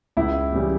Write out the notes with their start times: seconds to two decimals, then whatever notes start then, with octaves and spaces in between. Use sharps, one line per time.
0.17 C#2 E4
0.52 C#3 E3 G3